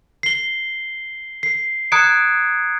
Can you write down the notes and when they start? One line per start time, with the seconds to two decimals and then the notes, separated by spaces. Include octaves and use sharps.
0.23 C7 G7
1.43 C7
1.92 A#5 D#6 F#6 G#6 C#7 D7